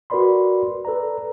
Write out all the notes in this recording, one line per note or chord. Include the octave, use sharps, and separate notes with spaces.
F#4 A#4 B4 D5 B5 C6
A4 B4 D5 A#5